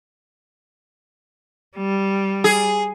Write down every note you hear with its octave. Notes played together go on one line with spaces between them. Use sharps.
G3
G#4